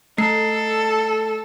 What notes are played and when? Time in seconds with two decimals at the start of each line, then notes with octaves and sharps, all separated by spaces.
0.18 A3 A4 C7